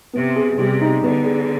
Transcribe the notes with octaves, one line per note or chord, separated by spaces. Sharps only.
C3 B3
G#4
C3 G3
D#4
D3 B3
G#4